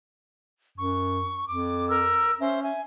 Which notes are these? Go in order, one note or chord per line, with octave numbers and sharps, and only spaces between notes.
F#2 C#6
F2 D6
A#4 E6
C#4 C5 E5
E5 G#5